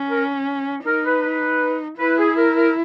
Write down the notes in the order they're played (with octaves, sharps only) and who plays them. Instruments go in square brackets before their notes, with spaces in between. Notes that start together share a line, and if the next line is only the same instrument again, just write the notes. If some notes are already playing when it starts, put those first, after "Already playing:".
Already playing: [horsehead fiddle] C#4
[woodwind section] A#4
[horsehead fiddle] D#4 [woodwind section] A#4
[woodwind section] B4
B4
[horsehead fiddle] E4 [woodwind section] B4
[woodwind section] G#4
A#4
A#4